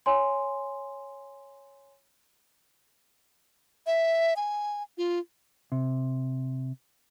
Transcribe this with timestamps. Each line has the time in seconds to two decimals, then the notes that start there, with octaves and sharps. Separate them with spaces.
0.06 C#5 G#5 C6
3.87 E5
4.36 G#5
4.98 F4
5.72 C3